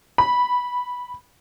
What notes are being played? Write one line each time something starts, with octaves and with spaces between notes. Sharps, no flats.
B5